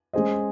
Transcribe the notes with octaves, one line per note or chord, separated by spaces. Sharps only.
G#3 C#4 G#4 C5 D#5